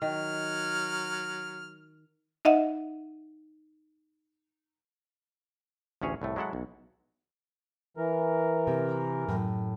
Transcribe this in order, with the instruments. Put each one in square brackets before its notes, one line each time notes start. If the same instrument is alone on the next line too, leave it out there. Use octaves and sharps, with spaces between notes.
[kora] D#3 [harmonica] F#3 F6
[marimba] D#4 D#5 E5 F#5
[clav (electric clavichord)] A1 D2 C#4 G#4 C#5
C2 A2 A3
F#3 G#3 E4 A4 F#5
B1
[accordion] E3 A#4
[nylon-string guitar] C3
F#2 A2